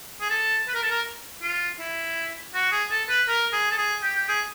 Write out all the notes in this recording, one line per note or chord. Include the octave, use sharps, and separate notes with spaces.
G#4
A4
B4
A#4
A4
A#4
F4
E4
F#4
G#4
A4
B4
A#4
G#4
A4
G#4
G4
G4
G#4